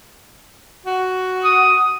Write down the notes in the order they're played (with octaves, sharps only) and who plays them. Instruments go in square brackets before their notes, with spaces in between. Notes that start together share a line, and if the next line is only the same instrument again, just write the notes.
[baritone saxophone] F#4
[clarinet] D#6